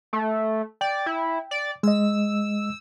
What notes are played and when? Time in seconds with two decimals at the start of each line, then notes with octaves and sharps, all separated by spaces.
0.13 A3
0.81 D5 G5
1.06 E4
1.51 D5
1.83 G#3 D#5 E6